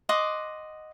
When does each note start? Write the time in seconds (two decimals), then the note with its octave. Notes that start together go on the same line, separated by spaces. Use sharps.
0.09 D#5 F#5 C6 D6